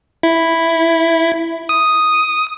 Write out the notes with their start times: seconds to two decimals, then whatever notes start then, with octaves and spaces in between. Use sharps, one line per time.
0.23 E4
1.69 D#6